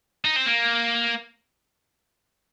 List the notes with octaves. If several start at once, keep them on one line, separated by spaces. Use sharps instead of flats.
D#4
C4
A#3